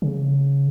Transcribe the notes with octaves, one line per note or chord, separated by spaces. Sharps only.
C#3